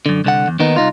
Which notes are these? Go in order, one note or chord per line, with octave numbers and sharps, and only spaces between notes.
F#2 D3
C2 D3 F#5
E2
D#2 D#3 B3 D#4
C2 D#4 F4